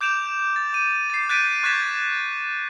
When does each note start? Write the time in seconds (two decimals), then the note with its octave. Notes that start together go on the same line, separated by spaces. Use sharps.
0.01 D6 G6 D7 E7 F7
0.56 A6
0.73 D6 D#7
1.10 A6 C7
1.29 F#6 G6 A6 B6 D7 D#7
1.63 C#6 F#6 G#6 A6 B6 E7